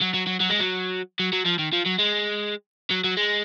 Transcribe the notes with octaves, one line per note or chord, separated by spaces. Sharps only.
F#3
F#3
F#3
F#3
G#3
F#3
F#3
F#3
F3
D#3
F3
F#3
G#3
F#3
F#3
G#3